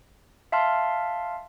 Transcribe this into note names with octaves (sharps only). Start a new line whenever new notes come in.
E5 F5 A5 C6 F6